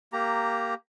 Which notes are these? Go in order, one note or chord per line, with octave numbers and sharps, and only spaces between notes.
A#3 G4 A#5